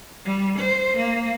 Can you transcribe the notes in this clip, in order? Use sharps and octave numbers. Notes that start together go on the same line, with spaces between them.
G3
C5
A#3